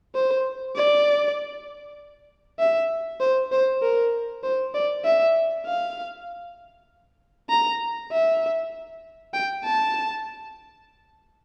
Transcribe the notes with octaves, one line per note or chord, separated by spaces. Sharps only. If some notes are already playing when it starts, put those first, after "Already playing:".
C5
D5
E5
C5
C5
A#4
C5
D5
E5
F5
A#5
E5
G5
A5